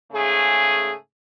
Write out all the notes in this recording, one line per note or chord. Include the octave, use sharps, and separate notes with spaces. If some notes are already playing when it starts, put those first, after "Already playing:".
G#2 C#3 A3 G#4